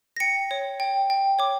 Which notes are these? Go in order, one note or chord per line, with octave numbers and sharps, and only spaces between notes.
A#6
G5 C#7
C#5
G5
G5
C#5 D6